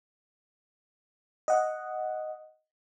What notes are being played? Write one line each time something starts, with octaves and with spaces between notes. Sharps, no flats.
D#5 F#5